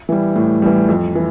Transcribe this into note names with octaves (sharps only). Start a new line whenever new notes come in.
E3 G3
A2
E3 G3
F2
E3